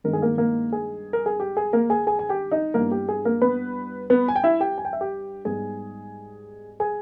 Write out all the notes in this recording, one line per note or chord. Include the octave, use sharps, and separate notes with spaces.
G2 D#3 G#3 B3 D#4 A#4
G#4
A#3 A#4
A#3 A#4
G#4
A#4
G#4
G4
G#4
A#3 A#4
G#4 G#5
G#4 G#5
G#5
G4 G5
D#4 D#5
G2 G3 A#3 B3 E4 A#4
G4
G#4
A#3 A#4
B3 B4
B3 B4
G#5
G5
E4 E5
G4 G5
G#5
G5
E5
G4 G5
G#2 G3 B3 D#4 G#4 G#5
G#4 G#5